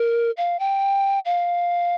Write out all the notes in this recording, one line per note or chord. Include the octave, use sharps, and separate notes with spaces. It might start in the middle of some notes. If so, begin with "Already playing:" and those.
Already playing: A#4
F5
G5
F5